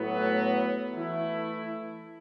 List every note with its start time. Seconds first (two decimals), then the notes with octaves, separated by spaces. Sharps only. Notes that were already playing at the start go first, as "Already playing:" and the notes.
Already playing: A2 F#3 B3
0.94 E3 A3 E4